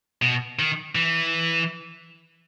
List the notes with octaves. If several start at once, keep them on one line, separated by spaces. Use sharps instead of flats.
B2
D#3
E3